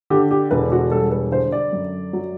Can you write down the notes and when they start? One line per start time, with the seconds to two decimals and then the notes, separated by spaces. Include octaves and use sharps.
0.10 D3 G4
0.31 G4
0.51 E1 B4
0.72 F#4
0.91 G3 A4
1.11 B4
1.31 D3 C5
1.52 D5
1.72 F#2
2.13 F#3